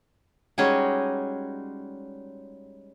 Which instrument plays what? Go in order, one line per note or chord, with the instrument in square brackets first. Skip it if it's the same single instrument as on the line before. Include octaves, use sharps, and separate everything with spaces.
[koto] G3 G#3 C#4 D#4 F#4 G#4